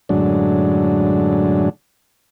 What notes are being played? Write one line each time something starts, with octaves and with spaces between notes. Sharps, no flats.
F#2 A2 D3 F#3 G#3 D4